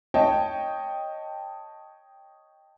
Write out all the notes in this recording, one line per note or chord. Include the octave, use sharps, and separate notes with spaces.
C#5 D#5 G5 A5